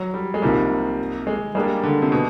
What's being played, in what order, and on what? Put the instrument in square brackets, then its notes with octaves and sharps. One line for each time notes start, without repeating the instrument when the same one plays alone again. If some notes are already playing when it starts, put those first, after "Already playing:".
Already playing: [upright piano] F#3
G3
G#3
[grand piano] C2 C3 F3 A#3 D#4 [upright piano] G3
[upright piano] G#3
[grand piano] G3 A#3 D4 G4 [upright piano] G#3
[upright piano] D3
C3
B2